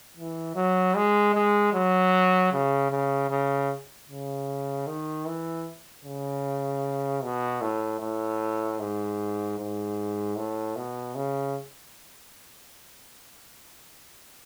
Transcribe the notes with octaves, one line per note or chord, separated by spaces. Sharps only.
E3
F#3
G#3
G#3
F#3
C#3
C#3
C#3
C#3
D#3
E3
C#3
B2
A2
A2
G#2
G#2
A2
B2
C#3